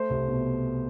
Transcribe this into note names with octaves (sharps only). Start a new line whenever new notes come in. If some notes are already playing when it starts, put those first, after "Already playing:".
Already playing: A3 C5
C2
B2